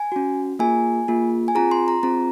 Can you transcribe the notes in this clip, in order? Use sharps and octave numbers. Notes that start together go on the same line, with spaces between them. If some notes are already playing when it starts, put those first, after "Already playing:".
Already playing: G#5
C#4 F#4
A#3 F4 G#4 G#5
A#3 F4 G#4
G#5
C4 F4 G#4 A#5
C6
A#5
C4 F4 G#4 A#5